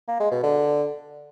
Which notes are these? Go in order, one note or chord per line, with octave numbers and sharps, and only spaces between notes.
A#3
G#3
B2
D3